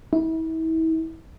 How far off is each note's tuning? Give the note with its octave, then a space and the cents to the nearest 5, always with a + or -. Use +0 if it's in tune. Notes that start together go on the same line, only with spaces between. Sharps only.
E4 -35